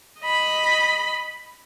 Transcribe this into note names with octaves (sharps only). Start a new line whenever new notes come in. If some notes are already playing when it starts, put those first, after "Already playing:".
D#5 B5